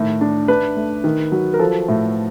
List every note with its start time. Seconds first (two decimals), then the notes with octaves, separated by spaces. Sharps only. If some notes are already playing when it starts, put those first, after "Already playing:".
Already playing: A2 D#3
0.21 D4
0.48 D4 B4
0.76 A3
1.04 D#3
1.32 F#3
1.54 A#4
1.59 F3 A4
1.88 A2